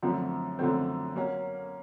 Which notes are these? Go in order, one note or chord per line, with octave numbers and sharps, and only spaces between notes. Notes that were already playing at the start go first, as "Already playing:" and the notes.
F#2 D3 F3 A3 C4
F#2 D3 F3 A3 C4
F#3 A#3 C#4